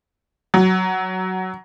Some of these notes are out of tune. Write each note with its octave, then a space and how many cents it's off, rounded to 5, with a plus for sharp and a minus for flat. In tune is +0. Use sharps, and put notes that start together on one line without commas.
F#3 +10